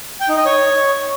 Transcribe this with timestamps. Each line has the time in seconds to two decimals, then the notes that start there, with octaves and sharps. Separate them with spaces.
0.21 G5
0.29 D#4
0.37 D#5
0.45 C#5